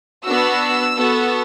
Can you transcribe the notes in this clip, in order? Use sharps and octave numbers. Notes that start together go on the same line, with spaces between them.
B3 D4 F#4 E6
B3 F#4 A4